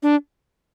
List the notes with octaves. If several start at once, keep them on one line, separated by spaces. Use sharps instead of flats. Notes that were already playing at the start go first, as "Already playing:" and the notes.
D4